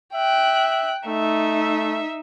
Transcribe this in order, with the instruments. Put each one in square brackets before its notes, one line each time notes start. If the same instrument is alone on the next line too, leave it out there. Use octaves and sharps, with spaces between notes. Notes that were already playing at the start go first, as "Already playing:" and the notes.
[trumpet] E5 [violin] G5 F#6
[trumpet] A3 [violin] D#4 E5